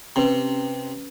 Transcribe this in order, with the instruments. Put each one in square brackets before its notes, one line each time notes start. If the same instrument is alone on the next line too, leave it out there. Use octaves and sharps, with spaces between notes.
[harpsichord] C3 [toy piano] C#4 G4 B4